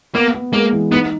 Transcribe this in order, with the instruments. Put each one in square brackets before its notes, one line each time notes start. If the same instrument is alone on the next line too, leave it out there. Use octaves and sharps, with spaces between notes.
[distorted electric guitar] A#3 [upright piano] B3
[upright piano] B3
[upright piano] G#3 [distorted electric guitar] A#3
[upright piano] E3
[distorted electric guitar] B3 [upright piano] D#4